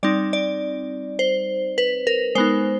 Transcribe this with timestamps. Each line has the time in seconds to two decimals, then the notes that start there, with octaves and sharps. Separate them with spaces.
0.03 G3 C4 D#4 D5
0.33 D5
1.19 C5
1.78 B4
2.07 A#4
2.35 G#3 B3 D#4 C5